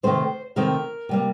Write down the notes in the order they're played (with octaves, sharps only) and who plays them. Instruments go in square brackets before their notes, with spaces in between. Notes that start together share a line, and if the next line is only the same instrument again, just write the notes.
[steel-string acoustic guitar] C3 D#3 A3 C4 C5
C3 D#3 A3 C4 A#4
C3 G3 A#3